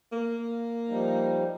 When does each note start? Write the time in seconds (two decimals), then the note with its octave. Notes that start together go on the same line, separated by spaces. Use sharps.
0.12 A#3
0.88 F3 G3 D#4